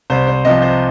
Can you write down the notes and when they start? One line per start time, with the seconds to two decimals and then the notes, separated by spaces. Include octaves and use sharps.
0.10 C2 C5
0.27 C5
0.45 C3 F3 D#5
0.62 C5